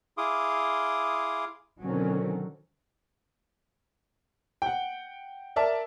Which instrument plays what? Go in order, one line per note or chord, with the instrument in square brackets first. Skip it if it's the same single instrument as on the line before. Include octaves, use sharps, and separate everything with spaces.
[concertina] E4 G#4 F5 C6 D6 D#6
[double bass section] B2 D3 D#3 F#3 C4 C#4
[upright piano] F#5 G5
A#4 D5 E5 A5